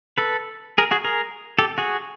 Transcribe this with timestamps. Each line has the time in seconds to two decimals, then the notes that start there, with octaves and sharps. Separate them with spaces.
0.18 A4 B4
0.78 G#4 A#4
0.91 F#4 G#4
1.04 G#4 A#4
1.59 G4 A4
1.78 F#4 G#4